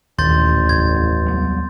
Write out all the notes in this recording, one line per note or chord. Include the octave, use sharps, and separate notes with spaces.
D#1 A1 D#2 C6 G6 A6
F1 G#6
C2 F#3 B3